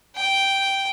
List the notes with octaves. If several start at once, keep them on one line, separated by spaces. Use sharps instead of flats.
G5